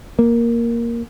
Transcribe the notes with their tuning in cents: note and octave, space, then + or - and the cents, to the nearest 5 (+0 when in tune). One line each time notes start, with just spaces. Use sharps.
A#3 +5